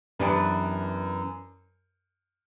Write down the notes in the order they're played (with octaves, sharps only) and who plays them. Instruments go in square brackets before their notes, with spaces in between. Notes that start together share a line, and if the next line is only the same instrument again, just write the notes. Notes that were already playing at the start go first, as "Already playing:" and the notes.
[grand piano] F#2 [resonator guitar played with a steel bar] E3 B3 D4 G4 B4